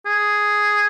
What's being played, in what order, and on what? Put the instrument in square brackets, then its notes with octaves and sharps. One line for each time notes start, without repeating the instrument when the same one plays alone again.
[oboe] G#4